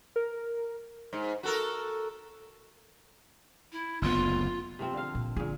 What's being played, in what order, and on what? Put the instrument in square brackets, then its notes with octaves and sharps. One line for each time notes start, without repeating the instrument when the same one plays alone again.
[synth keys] A#4
[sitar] G#2
F#4 A4 A#4
[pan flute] E4
[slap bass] F#1 D2 B3 [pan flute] F4
[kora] C3 F3 C4
D3 F5
[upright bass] A#2
[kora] A#2 G#4 [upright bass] D3